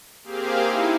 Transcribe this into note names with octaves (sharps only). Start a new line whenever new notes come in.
A#3 C4 G4 G#4 F5
D#4 E4